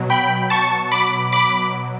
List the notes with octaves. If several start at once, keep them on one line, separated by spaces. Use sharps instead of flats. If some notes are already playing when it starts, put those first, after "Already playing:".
Already playing: B2 F#3
G5 B5
A5 C#6
B5 D6
B5 D6